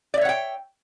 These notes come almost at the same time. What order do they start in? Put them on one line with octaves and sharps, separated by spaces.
D5 E5 C#5 F#5 G5